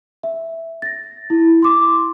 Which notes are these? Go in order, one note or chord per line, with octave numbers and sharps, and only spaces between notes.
E5
A6 A#6
E4
C6 D6